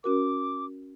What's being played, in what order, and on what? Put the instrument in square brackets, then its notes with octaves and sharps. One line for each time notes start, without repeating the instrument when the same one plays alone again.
[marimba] C#4 F#4 A#4 [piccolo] D6